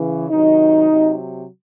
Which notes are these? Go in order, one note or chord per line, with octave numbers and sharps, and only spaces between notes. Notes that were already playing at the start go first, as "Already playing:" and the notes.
Already playing: C#3 E3
C3 D#3 F#3 D#4
C3 F#3